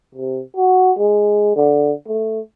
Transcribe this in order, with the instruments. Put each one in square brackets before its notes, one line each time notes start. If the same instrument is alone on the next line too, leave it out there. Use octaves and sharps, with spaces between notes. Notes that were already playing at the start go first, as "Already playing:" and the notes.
[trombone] C3
F#4
G#3
D3
A3